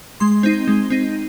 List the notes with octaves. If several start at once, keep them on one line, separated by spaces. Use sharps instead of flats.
G#3 C6
C4 D#4
G#3
C4 D#4